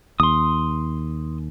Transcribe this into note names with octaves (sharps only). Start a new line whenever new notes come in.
D#2 C6 D#6